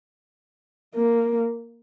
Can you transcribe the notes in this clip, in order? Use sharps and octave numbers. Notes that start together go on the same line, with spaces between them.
A#3